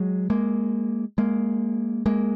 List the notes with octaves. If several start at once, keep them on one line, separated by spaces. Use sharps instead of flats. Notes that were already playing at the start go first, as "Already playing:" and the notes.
Already playing: F#3 G#3
G#3 A#3
G#3 A#3
G#3 A#3